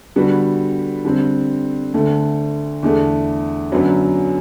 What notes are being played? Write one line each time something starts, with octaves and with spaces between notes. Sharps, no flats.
D3 G3 B3 F#4
D3 G3 C4
D2 D3 A3
E2 D3 A3
F#2 D3 F#3 B3